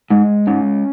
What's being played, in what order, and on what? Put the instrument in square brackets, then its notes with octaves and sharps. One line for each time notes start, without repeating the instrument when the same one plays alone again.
[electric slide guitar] G#2 [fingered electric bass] G#3
[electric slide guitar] G#2 [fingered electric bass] C#4